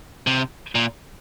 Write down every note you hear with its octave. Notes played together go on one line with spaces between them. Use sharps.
C3
A#2